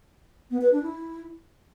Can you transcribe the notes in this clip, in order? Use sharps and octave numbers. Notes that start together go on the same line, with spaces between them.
B3
B4
D4
E4